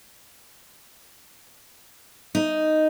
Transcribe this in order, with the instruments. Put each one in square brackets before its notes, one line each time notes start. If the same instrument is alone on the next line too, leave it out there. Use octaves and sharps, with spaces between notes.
[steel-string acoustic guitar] D#4